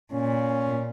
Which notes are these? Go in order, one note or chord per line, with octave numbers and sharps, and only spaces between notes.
A#2 C#4